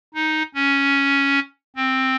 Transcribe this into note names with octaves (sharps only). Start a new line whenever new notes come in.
D#4
C#4
C4